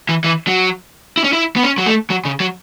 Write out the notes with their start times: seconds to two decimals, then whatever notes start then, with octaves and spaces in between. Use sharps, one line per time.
0.09 E3
0.24 E3
0.47 F#3
1.17 E4
1.24 C#4
1.33 E4
1.56 B3
1.63 C#4
1.78 F#3
1.86 A3
2.10 F#3
2.25 C#3
2.40 F#3